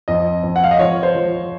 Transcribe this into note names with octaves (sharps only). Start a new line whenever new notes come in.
F2 D#5
F2
F#5
F5
D#5
F3 C#5
C5
F3